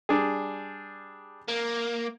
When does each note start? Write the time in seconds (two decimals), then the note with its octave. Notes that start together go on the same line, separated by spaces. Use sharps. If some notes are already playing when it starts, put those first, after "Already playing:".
0.09 G3 D4 G#4
1.48 A#3